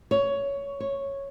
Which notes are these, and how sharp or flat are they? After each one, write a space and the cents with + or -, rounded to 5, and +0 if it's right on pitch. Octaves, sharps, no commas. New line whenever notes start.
C#5 +15
C#5 -5